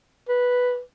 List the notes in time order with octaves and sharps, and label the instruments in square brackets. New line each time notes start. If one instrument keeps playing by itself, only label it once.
[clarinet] B4